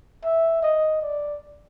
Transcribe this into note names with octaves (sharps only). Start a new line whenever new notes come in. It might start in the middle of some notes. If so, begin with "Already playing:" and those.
E5
D#5
D5